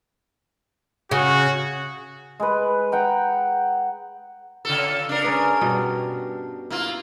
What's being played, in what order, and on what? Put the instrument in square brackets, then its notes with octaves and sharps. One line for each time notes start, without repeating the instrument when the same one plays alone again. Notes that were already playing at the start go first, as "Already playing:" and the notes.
[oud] C#3 [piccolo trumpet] F#4
[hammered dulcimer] G#3 B4
F#5 G5 A#5
[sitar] C#3 F4 A4
D4 A#4
[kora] C#4 G#4 B4
G2 B2 G3
[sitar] A#3 F4 [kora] E4